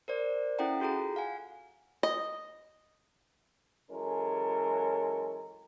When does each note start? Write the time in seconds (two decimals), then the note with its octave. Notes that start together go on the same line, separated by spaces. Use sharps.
0.08 A#4 C5 D5
0.59 C#4 E4 A4 F#5 G5 A#5
0.80 F4 F#4 G#4 A4 A#5
1.16 F5 F#5 G#5
2.03 D#5
3.92 E3 F#3 G#3 C#4 A4 A#4